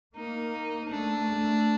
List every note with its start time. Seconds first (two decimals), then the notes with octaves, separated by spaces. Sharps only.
0.16 A#3 D#4
0.89 A3 D4
1.26 A3